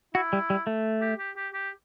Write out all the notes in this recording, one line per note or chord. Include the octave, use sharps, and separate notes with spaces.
E4 F#4
G3
G3
A3
G4
G4
G4
G4